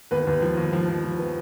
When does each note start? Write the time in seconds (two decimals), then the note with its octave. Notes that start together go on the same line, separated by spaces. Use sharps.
0.11 D#2 B3 B4
0.27 D#2
0.42 F3
0.57 D#2
0.73 F3
0.88 F3
1.04 F3
1.19 B3